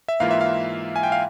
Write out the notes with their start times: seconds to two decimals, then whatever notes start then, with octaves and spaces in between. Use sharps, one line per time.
0.08 E5
0.20 G#2 E3 A#3 F4 F5
0.31 E5
0.41 F5
0.96 G#5
1.03 G5
1.12 F5